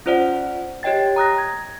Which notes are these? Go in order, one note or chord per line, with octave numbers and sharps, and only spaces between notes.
C#4 F4 C5 D5 F#5
G4 C#5 D#5 G5 A6
A#5 D#6 F#6 A#6
G#6